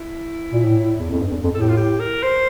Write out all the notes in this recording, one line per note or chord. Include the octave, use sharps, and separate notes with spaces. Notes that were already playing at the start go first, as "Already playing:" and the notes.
Already playing: E4
A#2
A2
E2
F2
G2
E2
F2
A2 A4
G4
F4
G4
A#4
C5